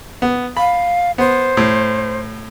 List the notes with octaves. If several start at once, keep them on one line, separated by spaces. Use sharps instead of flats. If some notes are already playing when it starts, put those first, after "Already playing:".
B3
F5 B5
B3 C5
A2